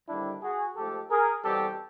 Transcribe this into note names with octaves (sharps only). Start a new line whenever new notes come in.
D#2 D3 G3 C4 D4 E4
F#4 G#4
G#2 F3 A3 G4 A4
G#4 A#4
E2 B2 G3 C4 G4 A4